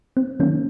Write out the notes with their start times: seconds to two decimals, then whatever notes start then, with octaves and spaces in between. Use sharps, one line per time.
0.17 C4
0.40 D#3 F#3 A#3 C#4